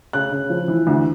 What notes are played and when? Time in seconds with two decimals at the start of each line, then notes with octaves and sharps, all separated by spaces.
0.13 C#3 F#6
0.32 C#3
0.50 F3
0.68 E3
0.87 D2